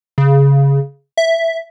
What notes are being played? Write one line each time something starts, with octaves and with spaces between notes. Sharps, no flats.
C#3
E5